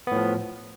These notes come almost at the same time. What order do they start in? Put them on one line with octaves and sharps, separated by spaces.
B3 A2 F3